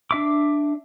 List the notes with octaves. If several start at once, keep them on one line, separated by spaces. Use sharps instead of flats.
D4 E5 D6